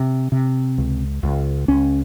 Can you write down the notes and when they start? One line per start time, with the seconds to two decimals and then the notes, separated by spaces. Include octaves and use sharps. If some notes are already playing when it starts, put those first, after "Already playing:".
Already playing: C3
0.32 C3
0.78 C#2
1.23 C#2
1.68 C#2 C#4